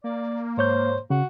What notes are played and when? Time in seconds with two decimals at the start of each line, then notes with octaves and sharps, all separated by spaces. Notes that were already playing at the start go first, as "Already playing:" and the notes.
0.04 A#3 D5
0.57 G#2 C5 C#5 G6
1.10 C#3 F#4